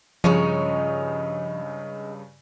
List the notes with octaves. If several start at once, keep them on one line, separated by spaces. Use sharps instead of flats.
G2 C#3 F3 G#3 C#4 D#4